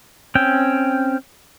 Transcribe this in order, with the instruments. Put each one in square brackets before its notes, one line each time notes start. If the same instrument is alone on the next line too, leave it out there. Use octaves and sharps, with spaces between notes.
[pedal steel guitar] C4 C#4 G5